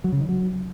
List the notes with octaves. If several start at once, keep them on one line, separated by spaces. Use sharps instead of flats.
F#3
C#3
D#3
F#3